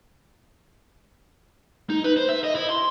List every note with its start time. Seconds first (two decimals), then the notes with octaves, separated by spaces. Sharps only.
1.90 D#4
2.04 B4
2.17 C5
2.29 E5
2.44 D#5
2.55 E4
2.70 C6